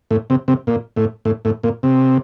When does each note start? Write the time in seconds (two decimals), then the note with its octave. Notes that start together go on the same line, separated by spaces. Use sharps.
0.11 A2
0.30 C3
0.48 C3
0.67 A#2
0.97 A2
1.25 A2
1.45 A2
1.63 A#2
1.83 C3